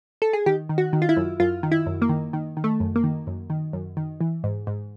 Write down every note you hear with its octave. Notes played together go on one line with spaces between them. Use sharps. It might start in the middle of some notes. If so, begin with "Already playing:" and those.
A4
G#4
D#3 G4
D#3
F#4
D#3
F4
E4
F#2
F#2 F4
D#3
E4
F#2
A#3
D#3
D#3
D#3
A3
F#2
A#3
D#3
F#2
D#3
F#2
D#3
E3
G#2
G#2